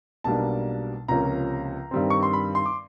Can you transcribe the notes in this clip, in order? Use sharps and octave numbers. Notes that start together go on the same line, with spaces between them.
B1 B2 G3 A#3 D4 A5
C#2 C3 F3 A#3 C#4 A#5
G2 D#3 G3 C4
C#6
C6
B5
C6
D6